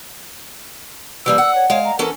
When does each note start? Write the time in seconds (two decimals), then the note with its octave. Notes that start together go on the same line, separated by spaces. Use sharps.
1.26 E3 G3 A#3 E6
1.38 F#5
1.55 C#5
1.70 G#3 C#5 F5
1.85 A#5
1.99 E3 C#4 A4 A#4